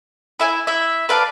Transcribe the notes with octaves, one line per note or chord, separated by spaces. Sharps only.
E4 E5 G#5
E4 E5
B4 D5 F5 A5